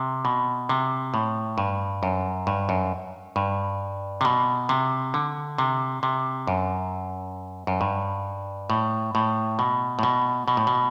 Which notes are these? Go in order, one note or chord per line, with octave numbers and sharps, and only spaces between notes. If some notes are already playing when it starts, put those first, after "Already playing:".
Already playing: C3
B2
C3
A2
G2
F#2
G2
F#2
G2
C3
B2
C3
D3
C3
C3
F#2
F#2
G2
A2
A2
B2
A2
B2
B2
A2
B2